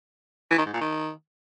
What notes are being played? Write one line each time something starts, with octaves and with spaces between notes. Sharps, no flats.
E3
D#3
G#2
A#2
D#3